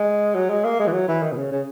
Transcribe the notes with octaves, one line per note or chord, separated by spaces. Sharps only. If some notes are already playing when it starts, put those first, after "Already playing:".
Already playing: G#3
F#3
G#3
A#3
G#3
E3
F#3
E3
D#3
B2
C#3
C#3